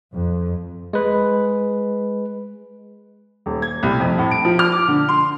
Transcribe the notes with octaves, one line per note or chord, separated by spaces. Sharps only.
F2
G#3 B4
D#1
G#6
C2
F2
A2
D7
F3
F6
D6
D3
C6